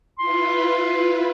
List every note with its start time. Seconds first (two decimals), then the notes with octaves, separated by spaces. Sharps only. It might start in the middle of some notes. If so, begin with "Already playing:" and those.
0.19 E4 F4 B4 C6